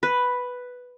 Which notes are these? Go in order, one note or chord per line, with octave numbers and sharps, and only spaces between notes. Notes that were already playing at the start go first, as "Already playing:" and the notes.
B4